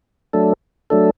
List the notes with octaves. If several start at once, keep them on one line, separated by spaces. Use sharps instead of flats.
F#3 A3 D4 A4
F#3 A3 D4 A4